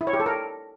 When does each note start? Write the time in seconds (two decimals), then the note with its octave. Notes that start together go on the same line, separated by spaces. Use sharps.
0.01 E4
0.07 C#5
0.13 G4
0.20 A4
0.26 A#4